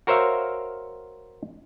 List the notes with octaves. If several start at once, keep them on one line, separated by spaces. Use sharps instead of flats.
F#4 A#4 C5 C#5 E5 F5